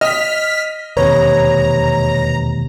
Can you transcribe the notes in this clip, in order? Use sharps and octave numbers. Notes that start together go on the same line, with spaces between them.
D#5 F6 B6
E1 D#2 C3 B4 C#5 A#5